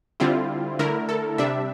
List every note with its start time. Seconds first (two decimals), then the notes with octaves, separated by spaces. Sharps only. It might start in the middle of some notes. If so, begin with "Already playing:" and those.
0.20 D3 G3 C4 E4 F4
0.79 D3 A3 E4 A#4
1.09 A4
1.38 C3 G3 D4 E5